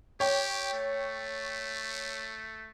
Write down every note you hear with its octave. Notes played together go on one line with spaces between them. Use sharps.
G4 C#5 G5
A3